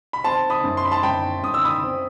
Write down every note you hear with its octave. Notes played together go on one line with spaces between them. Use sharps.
B5
C4 A5 C6
B5 D#6
F#2
C6
B5
A5 C6
F#2 G5 B5
F#2 D#6
E6
B5 D#6
C4